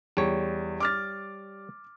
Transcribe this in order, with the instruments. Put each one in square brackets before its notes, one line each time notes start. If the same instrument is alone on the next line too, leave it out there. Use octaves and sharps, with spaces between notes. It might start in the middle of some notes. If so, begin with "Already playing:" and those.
[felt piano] E2 [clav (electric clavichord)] G3 C#5
[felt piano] D6 F6 A6